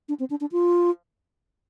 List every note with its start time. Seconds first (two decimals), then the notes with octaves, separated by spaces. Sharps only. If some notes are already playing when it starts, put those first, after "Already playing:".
0.09 D4
0.20 C4
0.30 D4
0.41 D4
0.52 F4